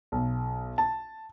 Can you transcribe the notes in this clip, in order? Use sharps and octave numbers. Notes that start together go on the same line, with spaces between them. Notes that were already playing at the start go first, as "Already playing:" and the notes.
B1
A5